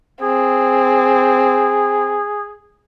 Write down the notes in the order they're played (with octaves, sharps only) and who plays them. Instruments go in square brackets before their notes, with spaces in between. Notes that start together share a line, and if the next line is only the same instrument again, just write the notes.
[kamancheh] C4 [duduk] G#4